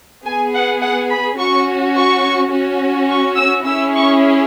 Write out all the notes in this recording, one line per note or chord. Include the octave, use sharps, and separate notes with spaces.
B3 G#4 G#5
F#5
F#5
B5
C#4 F#4 C#6
C#6
C#4 F#4
C#6
E6
C#4 E4 G#4 E6
C#6